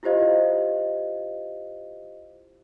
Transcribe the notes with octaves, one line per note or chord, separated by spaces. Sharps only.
E4 F4 G4 C5 D#5 F5